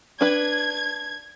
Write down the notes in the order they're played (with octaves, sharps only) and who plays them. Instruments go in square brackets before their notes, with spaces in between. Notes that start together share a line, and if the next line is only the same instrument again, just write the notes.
[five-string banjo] D4 B4 [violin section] G#6